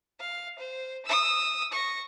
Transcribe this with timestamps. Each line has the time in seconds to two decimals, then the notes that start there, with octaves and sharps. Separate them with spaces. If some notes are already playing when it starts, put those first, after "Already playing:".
0.19 F5
0.58 C5
1.05 D#6 E6
1.72 C#6 A#6